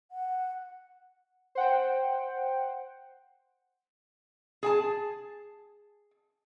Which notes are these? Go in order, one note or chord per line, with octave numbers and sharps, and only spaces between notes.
F#5
C5 F#5 G5
G#4 G#5 A5